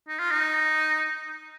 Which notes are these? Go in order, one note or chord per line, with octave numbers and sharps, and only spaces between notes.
D#4
F4
D#4